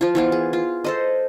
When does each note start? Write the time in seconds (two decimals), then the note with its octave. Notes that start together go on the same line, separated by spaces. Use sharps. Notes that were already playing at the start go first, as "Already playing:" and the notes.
0.01 F3 F4
0.15 E3 B3 F4
0.32 G#4
0.53 F4
0.84 A4 C5 D#5